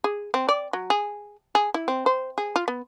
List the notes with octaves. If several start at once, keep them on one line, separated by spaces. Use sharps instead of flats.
G#4
C4
D5
F#3
G#4
G#4
E4
C4
C5
G#4
F4
B3